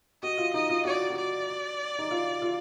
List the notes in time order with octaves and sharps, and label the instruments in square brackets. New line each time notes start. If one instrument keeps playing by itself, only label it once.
[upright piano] F#4 [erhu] D#5
[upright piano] F4
[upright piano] D#4 [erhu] D#5
[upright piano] F4
[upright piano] F#4 [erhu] D5
[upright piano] F#4
[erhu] D5
[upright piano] D#4
F4
F4